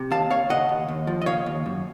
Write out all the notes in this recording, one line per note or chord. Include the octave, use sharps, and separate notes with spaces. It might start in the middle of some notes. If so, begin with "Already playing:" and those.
Already playing: C3
D#2 F5 A5
D#2 C#5 F5
C#3 D#5 F#5
D#2
D#2
F3
D#5
C#3 C#5 F5
D#2
F#2